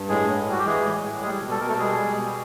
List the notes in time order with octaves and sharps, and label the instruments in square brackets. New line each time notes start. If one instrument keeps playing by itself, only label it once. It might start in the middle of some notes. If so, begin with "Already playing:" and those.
Already playing: [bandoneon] G2
A2 G#3 G#4
A2
G3 F#4
G4
E3 G#3 G#4
A2
A2
G3 G#3 G#4
B2
A4
B2 A#4
A3 A4
G3 G#3 G#4
G3
B2